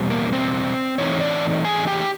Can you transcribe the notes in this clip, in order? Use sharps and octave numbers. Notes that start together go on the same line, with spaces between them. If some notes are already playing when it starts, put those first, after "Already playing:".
Already playing: E2 B2 G3 C4
A#3 A#4
C4 C5
E3 A3 C4 D#4 C#5
D4 D5
G#4 G#5
G4 G5